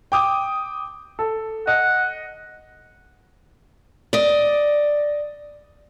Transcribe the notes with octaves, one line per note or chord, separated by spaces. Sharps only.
G5 D6 D#6
A4
D#5 F#5
D5 D#5